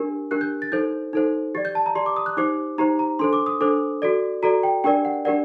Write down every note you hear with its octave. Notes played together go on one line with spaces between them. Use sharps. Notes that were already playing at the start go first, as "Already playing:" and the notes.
Already playing: D4 G4 A#4
D4 G4 A#4 F#6
G6
A6
D#4 A4 C5 G6
D#4 A4 C5
G4 D5 A6
G6
A5
A#5
G4 D5 C6
D6
D#6
F#6
D#4 G4 C5 D6
D#4 G4 C5 A#5
A#5
D4 A4 C5 C6
D6
D#6
D4 A4 C5 D6
F#4 A4 D5
F#4 A4 D5 A#5
G5
D4 G4 A#4 D5 G5
F#5
D4 G4 A#4 D5 F#5